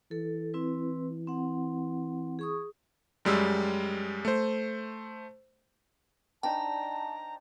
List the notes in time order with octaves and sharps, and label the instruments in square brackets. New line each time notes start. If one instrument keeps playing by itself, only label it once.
[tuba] E3 [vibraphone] A4
[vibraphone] C4 E4 B4
C4 F#5
G#4 C#6 D#6
[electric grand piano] F#2 G3 G#3 E6
A3 C5
[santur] D4 D#4 C5 [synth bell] G5 [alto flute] A5 [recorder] A#5